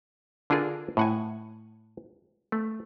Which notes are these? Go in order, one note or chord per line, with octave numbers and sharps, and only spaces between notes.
D3 D4 F4 G#4 A#4
A2 F#5 G#5
A3